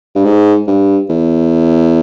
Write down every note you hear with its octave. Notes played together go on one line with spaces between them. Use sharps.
G2
G#2
G2
E2